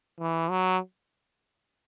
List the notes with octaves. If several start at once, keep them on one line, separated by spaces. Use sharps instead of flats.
E3
F#3